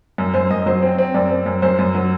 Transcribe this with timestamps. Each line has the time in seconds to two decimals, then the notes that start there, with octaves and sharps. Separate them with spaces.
0.18 F#2
0.34 F#2 C5
0.51 F#2 D#5
0.66 F#3 C5
0.82 C4
0.98 C4
1.14 F#2 D5
1.31 C4
1.46 F#2
1.62 F#2 C5
1.79 F#2
1.95 F#3